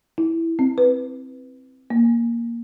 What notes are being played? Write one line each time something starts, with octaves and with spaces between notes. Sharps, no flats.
E4
C4
B4
A#3